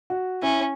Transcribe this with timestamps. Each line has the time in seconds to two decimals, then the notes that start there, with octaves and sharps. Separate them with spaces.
0.10 F#4
0.42 C#4 E4